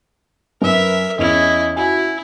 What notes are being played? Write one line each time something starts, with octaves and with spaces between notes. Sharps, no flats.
F#2 A#4 B4 E5
E2 C#4 E4 D#5
E4 F#4 G#5